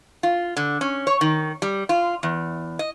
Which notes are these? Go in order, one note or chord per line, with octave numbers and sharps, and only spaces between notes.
F4
D3
C#4
C#5
D#3
G3
F4
E2
D#5